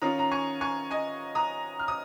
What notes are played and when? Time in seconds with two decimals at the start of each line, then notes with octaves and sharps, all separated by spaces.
0.02 D#3 C#4 F4 A#5 D#6
0.19 A#5
0.31 G#5 C#6
0.61 G#5 C#6
0.91 D#5 G#5
1.35 A#5 D#6
1.80 F6
1.88 D#6